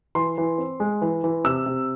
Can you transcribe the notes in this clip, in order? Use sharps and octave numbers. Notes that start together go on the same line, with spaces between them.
E3 C6
E3
C4
G#3
E3
E3
C3 E6
C3